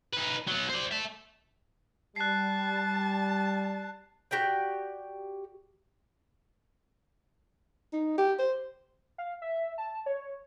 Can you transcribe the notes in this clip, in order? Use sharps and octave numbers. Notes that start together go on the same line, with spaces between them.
D#4 B4
F#3 B3
C5 D5
E5 A5
G3 A5 F#6 C7
F#4 G4 D5 G5
D#4
G4
C5
F5
E5
A5
C#5